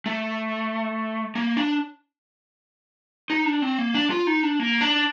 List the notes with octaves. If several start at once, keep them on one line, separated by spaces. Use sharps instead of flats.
A3
A#3
D4
D#4
D4
C4
A#3
D4
F4
D#4
D4
A#3
D4